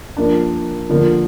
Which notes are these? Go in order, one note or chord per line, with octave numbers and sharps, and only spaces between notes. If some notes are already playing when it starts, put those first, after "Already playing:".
F3 A#3 D4
D3 F3 A#3